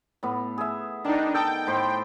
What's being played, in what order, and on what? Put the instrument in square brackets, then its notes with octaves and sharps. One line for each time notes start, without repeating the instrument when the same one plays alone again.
[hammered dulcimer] A2 B3
G#4 E5
[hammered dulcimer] D#3 [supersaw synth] D4 D#4
[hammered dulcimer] A4 D#5 A5 [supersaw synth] G5
[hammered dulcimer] A2 C5 C6